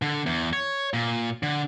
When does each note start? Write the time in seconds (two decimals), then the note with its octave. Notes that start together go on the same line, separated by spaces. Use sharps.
0.02 D3
0.26 E2
0.53 C#5
0.94 A#2
1.43 D3